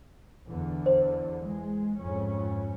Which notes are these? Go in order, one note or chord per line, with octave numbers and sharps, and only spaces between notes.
E2 D3
C5
G#3
F2 G#2 C#4